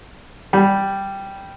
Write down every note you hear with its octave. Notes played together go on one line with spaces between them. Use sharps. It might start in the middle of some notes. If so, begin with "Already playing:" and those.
G3